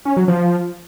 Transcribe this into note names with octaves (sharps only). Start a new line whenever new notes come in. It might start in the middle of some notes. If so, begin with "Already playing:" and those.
C#4
F#3
F3